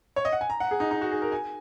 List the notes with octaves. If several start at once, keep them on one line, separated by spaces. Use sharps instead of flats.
C#5
D#5
F#5
G#5
A#5
F#5
G#4
D#4
D#4
F#4
G#4
A#4
G#5